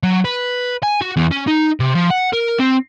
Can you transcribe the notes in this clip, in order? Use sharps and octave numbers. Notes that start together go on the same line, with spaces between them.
F#3
B4
G#5
F#4
E2
C#4
D#4
C3
F3
F#5
A#4
C4